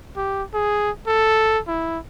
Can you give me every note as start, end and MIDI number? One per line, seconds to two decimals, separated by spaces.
0.16 0.43 67
0.54 0.91 68
1.07 1.59 69
1.67 1.98 64